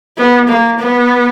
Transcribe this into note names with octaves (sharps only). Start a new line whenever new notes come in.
B3
A#3
B3